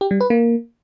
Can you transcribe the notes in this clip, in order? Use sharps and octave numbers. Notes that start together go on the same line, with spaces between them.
G4
G3
B4
A#3